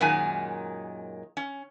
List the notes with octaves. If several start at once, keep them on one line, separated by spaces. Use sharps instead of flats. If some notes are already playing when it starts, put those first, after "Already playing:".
F#2 A#2 D#3 G#3 G#5
C#4